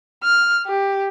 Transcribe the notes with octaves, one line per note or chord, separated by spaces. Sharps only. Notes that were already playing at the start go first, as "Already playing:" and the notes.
F6
G4